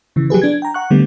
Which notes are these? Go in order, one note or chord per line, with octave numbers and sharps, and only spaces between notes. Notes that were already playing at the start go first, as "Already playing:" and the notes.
C#3 E3
F#3 G4 G#4 B4
D4 G#6
G5 A#5
F#5 C#6 F#6
D3 G3 A3 B3